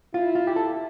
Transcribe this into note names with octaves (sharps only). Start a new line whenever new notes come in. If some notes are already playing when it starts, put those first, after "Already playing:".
E4 F4
F4
G4
A4